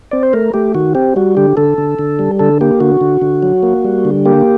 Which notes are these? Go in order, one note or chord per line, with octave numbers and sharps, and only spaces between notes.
C4 D5
C5
A3 A#4
A3 G4
D#3 F#4
C4 G4
G3 F#4
D3 G4
D3 A4
D3
D3
G3
D3 A4
A#3 G4
D3 F#4
D3
D3
F#3
A#3
G3
D3
A#3 G4